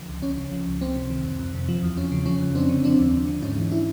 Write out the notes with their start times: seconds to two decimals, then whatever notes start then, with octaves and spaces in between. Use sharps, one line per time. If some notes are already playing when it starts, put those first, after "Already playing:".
Already playing: D3 F3
0.08 C#2
0.22 C#2 C#4
0.38 C#3
0.52 F3
0.66 C#2
0.81 C#2 C4
0.96 C3
1.10 D#3
1.24 F2
1.39 F2
1.54 C3
1.69 F3
1.83 E2
1.97 E2 C#4
2.12 C#3
2.26 F3 C#4
2.41 F2
2.55 F2 C4 D4
2.69 D3
2.84 F3 C4 D4
2.99 D#2
3.14 D#2
3.28 D3
3.42 G#2 C#4 D#4
3.57 E3
3.71 D4 E4